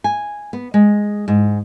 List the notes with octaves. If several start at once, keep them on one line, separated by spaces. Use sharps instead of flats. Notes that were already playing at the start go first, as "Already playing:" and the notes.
G#5
B3
G#3
G#2